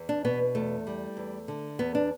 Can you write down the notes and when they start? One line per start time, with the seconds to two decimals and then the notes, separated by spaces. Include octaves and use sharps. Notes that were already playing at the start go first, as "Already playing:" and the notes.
Already playing: E2
0.09 D4
0.25 B2 B3
0.55 E2 A3
0.87 G3
1.17 E2
1.48 D3
1.79 E2 B3
1.95 D4